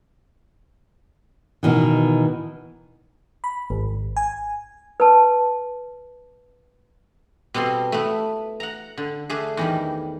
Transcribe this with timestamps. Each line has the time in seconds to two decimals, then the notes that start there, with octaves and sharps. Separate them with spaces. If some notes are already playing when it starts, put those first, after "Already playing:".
1.63 B2 D#3 E3
3.44 B5
3.70 G#1
4.17 G#5
5.00 B4 A5
7.54 B2 G3 C4 A4 C6
7.92 A3 B3 E4
8.60 F#5 A#5
8.98 D3
9.30 A3 D4 G#4
9.57 E2 D#3 G3